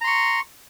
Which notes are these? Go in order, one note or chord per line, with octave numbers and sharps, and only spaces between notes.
A#5 C6 C#6